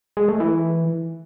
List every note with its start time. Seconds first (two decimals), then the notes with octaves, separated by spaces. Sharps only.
0.17 G#3
0.29 A3
0.40 E3